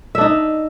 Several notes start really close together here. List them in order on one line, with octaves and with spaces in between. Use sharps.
E5 D4 D#4